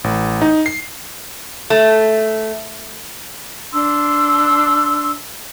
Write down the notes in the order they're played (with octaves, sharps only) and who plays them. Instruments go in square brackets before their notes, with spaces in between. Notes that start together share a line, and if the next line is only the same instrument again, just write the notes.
[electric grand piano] A1
D#4
C7
[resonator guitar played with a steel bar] A3
[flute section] D4 C6 E6